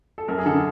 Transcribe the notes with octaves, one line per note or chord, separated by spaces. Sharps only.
A4
F#2 A#4
G#4
D3 A4